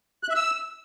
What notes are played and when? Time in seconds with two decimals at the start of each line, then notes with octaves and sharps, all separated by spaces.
0.23 F#6
0.29 E5
0.35 E6